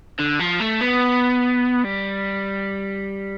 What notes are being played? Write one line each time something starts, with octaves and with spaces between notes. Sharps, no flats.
D3
F3
A3
B3
G3